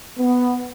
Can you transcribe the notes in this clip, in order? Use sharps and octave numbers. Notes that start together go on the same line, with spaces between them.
B3